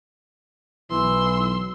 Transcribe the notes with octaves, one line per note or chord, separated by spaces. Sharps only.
B1 E3 C6 E6